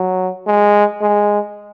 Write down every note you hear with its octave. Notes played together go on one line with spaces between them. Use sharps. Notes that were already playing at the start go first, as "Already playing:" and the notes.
Already playing: F#3
G#3
G#3